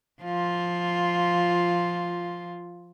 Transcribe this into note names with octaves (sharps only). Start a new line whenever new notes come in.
F3 F4